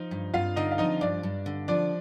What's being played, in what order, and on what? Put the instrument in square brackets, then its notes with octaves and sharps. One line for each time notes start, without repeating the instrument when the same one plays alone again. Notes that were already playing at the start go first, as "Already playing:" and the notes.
Already playing: [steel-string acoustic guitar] F3 [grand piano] D#4
[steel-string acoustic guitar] G2
[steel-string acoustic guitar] G2 [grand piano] F4 F5
[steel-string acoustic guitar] D3 [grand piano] D#4 D#5
[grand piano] F5
[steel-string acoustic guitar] F3 [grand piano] D#4 D#5
[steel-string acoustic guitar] G2 [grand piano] D4 D5
[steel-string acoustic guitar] G2
D3
[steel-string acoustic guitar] F3 [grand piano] D4 D5